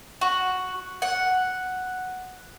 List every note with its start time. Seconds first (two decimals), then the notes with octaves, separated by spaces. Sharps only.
0.21 F#4
1.02 F#5